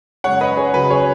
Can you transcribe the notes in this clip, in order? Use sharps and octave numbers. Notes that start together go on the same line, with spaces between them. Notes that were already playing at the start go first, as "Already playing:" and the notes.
F#2 C#3 G#3 C#5 F#5
B4 D#5
G#4 C#5
C#2 C#3 F#3 B4
G#4 C#5